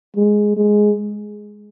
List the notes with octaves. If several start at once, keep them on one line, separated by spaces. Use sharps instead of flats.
G#3
G#3